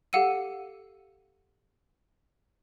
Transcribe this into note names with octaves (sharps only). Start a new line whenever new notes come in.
G4 A4 F5 F#5 E6 D#7